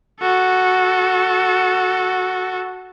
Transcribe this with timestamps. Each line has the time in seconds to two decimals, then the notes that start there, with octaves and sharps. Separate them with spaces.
0.21 F#4 A4